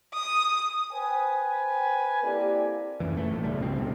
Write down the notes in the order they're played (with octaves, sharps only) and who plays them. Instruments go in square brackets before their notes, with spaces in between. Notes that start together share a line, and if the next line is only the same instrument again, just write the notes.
[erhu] D#6
[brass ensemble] B4 C5 G5 G#5
A#3 C4 E4 G4 A4 D5
[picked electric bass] F#2 E3
A3
A#1 A2
G#2 C#3 G3 A3
C#2 B2 C4
E1 D2 C4